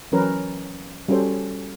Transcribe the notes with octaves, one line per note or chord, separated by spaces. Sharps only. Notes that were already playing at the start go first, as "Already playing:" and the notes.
E3 F#3 C#4 A#4 B4
G3 C#4 F#4 A4 C5